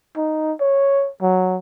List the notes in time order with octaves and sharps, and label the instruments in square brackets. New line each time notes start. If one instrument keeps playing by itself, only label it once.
[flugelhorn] D#4
C#5
F#3